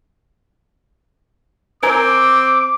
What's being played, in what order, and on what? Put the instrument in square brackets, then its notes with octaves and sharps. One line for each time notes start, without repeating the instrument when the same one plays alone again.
[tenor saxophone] C4 [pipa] A#4 G#5 [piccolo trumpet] D6